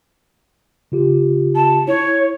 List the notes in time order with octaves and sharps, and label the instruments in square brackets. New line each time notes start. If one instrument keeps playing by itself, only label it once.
[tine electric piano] C#3 F4 G4
[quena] A5
[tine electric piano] E4 [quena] C#5